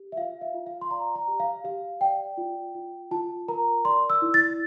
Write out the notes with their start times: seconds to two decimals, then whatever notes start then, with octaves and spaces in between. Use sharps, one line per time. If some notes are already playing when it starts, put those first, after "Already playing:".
Already playing: G4
0.12 E5
0.17 F4 F5
0.42 E5
0.54 F4
0.66 F5
0.81 C6
0.91 D5 A#5
1.15 A#5
1.28 G4
1.40 F5
1.64 G4 F5
2.01 D5 G5
2.37 F4
2.75 F4
3.11 F4 A5
3.48 A#4 A#5
3.85 D5 C6
4.10 E6
4.22 E4
4.34 A6